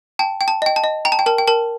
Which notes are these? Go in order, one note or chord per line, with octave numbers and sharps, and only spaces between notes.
G5 A5
G5
A5
D#5 G5
A5
D#5
G5 A#5
A5
G5
A#4 A5
G5
A#4 A5